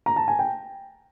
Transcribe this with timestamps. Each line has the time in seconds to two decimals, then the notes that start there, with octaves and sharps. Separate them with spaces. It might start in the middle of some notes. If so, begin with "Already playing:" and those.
0.06 A#5
0.16 A5
0.28 G#5
0.39 G5